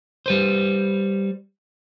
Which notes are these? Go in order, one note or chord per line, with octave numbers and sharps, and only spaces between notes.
G3 B4 C5